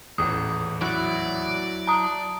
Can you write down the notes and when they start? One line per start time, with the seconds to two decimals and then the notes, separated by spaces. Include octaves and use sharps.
0.18 D#1 A1 E2 D#6
0.81 F#3 E4 F#4 D5
1.87 A5 A#5 D#6